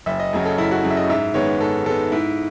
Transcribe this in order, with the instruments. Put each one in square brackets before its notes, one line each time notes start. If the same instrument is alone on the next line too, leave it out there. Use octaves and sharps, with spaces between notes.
[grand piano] F#1 E5
D#5
F#2 C#3 F#3
A4
F#1 E4
F#4
F#2 C#3 F#3
E5
D#5
G#2 E5
D#3 G#3 B3 C#5
G#2 A4
D#3 G#3 B3 A4
G#2 E4